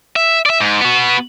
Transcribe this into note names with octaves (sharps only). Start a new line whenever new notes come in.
E5
D5 E5
G#2
B3 F#4